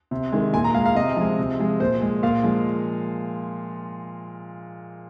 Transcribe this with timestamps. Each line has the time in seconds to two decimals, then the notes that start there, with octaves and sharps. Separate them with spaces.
0.11 C3
0.32 D#3 G#3
0.53 A#2 G#5
0.64 A#5
0.74 G#3 F5
0.86 F5
0.95 C3 D#5
1.17 F3 G#3
1.38 C3
1.59 F3 G#3
1.80 A#2 C5
2.02 G#3
2.23 A#2 F5
2.44 F3 G#3